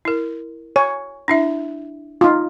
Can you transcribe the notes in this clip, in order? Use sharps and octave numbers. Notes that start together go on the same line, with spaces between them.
E4 A#4
C#5 G#5
D4 E4 E5
D#4 F4